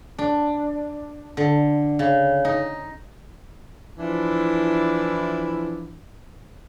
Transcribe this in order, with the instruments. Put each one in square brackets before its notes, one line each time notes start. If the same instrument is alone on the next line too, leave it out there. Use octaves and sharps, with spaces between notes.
[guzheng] D4
D3
C#3
D#4
[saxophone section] E3 F3 D4 E4